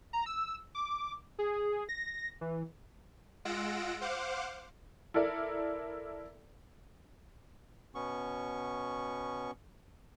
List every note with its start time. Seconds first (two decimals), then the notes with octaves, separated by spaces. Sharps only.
0.13 A#5
0.26 E6
0.75 D6
1.39 G#4
1.89 A#6
2.41 E3
3.45 G#3 F4 F#5 E6 A#6 D7
4.01 C5 F5 F#5 D6
5.14 E4 A4 A#4 D5
7.95 B2 B3 C#4 C#6